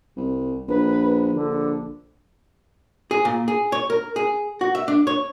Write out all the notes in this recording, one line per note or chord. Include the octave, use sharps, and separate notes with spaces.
C2
A#1 B4
A#1 D3
G#4
A#2
G#4
C#5
A#4
G#4
F#4
E5
D4
C#5